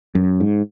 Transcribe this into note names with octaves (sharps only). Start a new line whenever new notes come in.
F#2
G#2